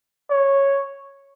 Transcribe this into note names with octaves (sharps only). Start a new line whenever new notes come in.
C#5